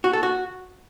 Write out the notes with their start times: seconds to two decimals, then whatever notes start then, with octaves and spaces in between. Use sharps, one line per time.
0.04 F#4
0.13 A4
0.23 F#4